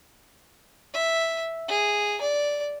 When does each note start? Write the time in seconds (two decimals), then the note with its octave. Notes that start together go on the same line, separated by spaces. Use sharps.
0.93 E5
1.69 G#4
2.21 D5